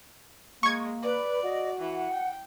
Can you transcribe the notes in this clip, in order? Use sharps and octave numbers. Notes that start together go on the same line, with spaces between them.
G#3 A#3 C#6 G#6
B4 D5
F#4 D#5
E3 F#5
G5